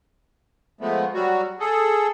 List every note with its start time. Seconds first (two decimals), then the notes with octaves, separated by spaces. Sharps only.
0.81 F3 G#3 A3 B3
1.14 F#3 G3 F#4
1.60 G#4 A4